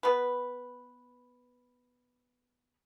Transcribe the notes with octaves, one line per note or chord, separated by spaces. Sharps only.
B3 B4